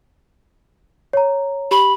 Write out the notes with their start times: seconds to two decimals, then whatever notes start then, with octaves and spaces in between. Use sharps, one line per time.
1.13 C#5 A#5
1.71 G4 B5